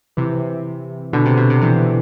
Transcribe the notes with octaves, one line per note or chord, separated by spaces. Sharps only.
C3 E3
B2 D3
C3
B2
C3
C3 E3